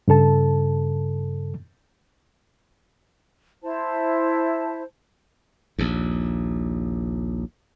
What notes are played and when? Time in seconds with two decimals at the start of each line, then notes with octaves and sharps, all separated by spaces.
0.08 G2 C#3 A4 A5
3.63 E4 C5 A5
5.79 A#1 D#2